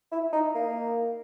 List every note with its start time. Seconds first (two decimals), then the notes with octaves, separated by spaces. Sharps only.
0.12 E4
0.33 D#4
0.54 A#3